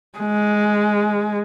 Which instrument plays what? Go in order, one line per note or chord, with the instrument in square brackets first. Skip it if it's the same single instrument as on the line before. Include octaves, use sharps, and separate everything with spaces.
[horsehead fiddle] G#3